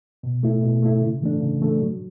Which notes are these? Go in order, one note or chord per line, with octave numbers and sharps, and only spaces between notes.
B2
A3 E4
B2
A3 E4
C#3
E3 A3 D4
C#3
E3 A3 D4
F#3